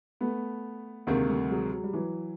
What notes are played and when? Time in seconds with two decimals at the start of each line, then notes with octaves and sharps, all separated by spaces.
0.21 A3 B3
1.07 D2 C3 D#3 G#3 A#3
1.28 G3 A3
1.50 F#3 G#3
1.72 F#3 G#3
1.84 G3
1.93 E3 F#3